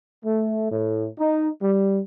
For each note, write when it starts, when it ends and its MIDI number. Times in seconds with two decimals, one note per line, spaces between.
0.24 0.70 57
0.71 1.05 45
1.19 1.48 63
1.61 2.00 55